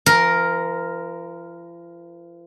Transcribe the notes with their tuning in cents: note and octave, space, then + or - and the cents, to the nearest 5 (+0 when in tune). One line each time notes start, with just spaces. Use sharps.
F3 -40 A#4 +0